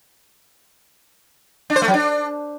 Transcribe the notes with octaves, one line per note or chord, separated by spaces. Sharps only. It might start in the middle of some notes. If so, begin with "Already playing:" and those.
D4
C5
A3
F#3
D4